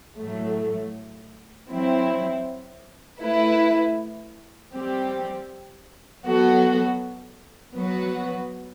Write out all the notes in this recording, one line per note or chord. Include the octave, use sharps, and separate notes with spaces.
A2 F#3 A3
F#3 C4 E4
A3 E4 B4
G3 C4 G4
F#3 B3 F#4 A4
F#3 B3 F#4 B4